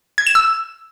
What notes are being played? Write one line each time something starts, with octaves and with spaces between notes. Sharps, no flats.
G#6
E7
E6